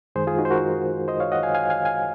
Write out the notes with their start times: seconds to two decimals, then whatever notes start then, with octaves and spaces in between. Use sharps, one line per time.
0.16 F#2 D#3 G#3 G#4 C5
0.27 F4 G#4
0.38 D#4 F#4
0.45 C5
0.50 F#4 A#4
1.08 C5 D#5
1.20 C#5 F5
1.32 D#5 F#5
1.43 F5 G#5
1.54 F5 G#5
1.70 F5 G#5
1.85 F5 G#5